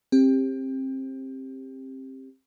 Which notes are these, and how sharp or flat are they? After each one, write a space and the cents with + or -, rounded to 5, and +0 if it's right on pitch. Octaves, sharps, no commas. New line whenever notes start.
C4 +25 G4 +15